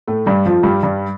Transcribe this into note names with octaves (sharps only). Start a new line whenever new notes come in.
A2 A3
G2 G3
F2 F3
G2 G3
G2 G3